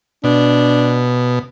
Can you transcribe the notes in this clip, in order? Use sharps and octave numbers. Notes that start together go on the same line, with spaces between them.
B2 D4